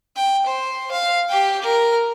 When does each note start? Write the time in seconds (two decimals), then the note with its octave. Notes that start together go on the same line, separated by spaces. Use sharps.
0.16 G5
0.46 C5
0.91 F5
1.28 G4 G5
1.62 A#4